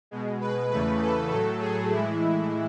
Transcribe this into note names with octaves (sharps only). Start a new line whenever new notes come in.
B2 G#3
B4
E2 C#3 E3 A3 B4
A4
A2 F#3 A3 A4
G#4
A2 E3 G#3 E4